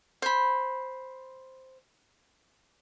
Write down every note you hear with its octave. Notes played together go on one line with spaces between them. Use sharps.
C5 B5